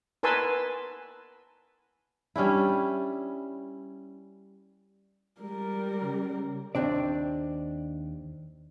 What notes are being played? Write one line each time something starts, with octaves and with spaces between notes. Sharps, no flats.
A#4 B4 G#5 A5 C6 E6
G3 C#4 D4 E4
G3 G#3 A#4
C#3
D#2 C4 D4 D5